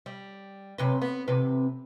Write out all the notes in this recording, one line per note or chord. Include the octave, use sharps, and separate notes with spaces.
G3
F#2 C3 B4
B3
E2 C3 B4